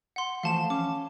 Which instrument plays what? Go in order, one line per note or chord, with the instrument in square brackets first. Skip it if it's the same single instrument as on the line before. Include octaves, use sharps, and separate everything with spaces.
[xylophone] F#5 C6
[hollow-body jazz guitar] E3 F3 A3 [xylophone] F5 A5 E7
[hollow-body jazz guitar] C#4 [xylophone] D6